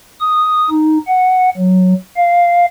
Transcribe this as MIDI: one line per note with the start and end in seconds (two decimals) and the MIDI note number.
0.21 0.69 87
0.70 0.98 63
1.07 1.50 78
1.58 1.94 54
2.16 2.65 77